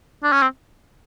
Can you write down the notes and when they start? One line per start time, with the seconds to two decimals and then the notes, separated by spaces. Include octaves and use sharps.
0.23 D4
0.32 C#4
0.42 C4